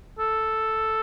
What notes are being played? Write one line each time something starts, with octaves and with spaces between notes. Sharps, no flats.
A4